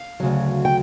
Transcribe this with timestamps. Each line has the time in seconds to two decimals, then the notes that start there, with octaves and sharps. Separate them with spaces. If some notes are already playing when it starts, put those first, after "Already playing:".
Already playing: F5
0.20 D2 C#3 F#3
0.65 G5